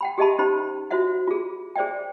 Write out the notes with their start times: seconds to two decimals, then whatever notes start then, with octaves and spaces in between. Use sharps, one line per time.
0.01 F#5 G5 B5
0.18 G4 G#4 D#5 E5 A5 B5
0.38 C#4 D#4 G4 C5 B5
0.90 F4 F#4 C5 C#5 E5 F#5
1.28 F4 G#4
1.76 G#4 C5 D5 E5 G5